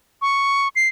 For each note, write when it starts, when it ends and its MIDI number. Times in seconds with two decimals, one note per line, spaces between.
0.22 0.68 85
0.76 0.88 96